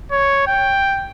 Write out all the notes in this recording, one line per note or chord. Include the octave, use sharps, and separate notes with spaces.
C#5
G5